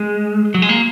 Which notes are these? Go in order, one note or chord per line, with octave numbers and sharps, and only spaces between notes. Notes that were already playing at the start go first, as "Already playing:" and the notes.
Already playing: G#3
F#3
G#3
A#3